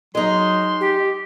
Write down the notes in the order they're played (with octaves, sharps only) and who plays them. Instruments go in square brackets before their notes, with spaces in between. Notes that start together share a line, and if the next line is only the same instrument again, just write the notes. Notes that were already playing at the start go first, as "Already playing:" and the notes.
[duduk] F#3 [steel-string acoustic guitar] G#3 D#4 [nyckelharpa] C6
[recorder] G4